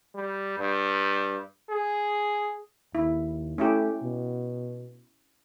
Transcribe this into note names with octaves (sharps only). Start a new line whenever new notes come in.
G3
G2
G#4
D#2 E4
A3 C#4 E4 G4
B2